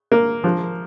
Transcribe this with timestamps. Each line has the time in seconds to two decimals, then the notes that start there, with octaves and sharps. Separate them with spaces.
0.12 A#3
0.44 F3